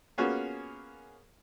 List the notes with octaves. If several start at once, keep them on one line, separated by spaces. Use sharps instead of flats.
A#3 B3 C#4 F4 F#4 G#4